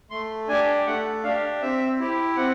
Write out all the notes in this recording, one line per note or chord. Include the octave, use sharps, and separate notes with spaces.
A3 C6
D4 G4 G#5
A3 F#5
D4 G4 F5
C4 E5
E4 G4
C4 F#5